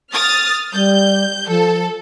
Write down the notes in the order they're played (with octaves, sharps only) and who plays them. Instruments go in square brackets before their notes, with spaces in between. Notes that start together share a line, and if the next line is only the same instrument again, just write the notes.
[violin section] D#6 F6 A6
[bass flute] G3 [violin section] G6
[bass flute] F3 [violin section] A4